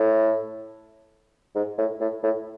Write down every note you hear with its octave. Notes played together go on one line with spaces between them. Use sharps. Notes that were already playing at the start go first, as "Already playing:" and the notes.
Already playing: A2
G#2
A2
A2
A2